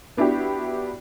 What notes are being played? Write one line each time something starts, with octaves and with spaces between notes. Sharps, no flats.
B3 D4 E4 F#4 G4